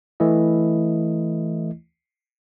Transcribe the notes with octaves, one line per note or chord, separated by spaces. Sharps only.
E3 A3 E4 D#5